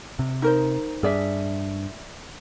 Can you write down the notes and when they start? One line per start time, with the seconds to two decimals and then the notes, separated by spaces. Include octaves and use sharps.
0.19 C3
0.42 D#4 A#4 C5
1.03 G2 G#4 D5 E5